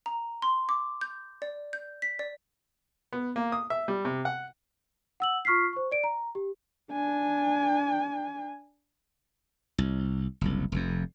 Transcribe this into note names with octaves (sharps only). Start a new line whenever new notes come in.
A#5
C6
D6
G6
D5
G6
B6
D5
B3
A#3
D#6
E5
G3
C3
F#5
F#5 E6 F#7
F4 C#6 F6 B6 C7
C5 C#6
D5 D7
A#5
G4
D4 G#5
C2
F#1 C2
F1 F2